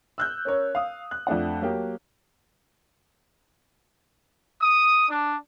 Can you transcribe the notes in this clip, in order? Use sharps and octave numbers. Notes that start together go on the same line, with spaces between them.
E6 F#6 G6
C#4 A#4 C#5
F5 D#6
F#6
F2 A3 D4 F#5
F#3 A#3 G4
D#6
D4